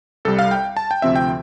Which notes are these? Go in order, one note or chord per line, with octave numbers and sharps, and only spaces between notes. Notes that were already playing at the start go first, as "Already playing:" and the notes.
C2 C3 G3 A4
F5
G5
A5
G5
D2 C3 F3 C4 E5
G5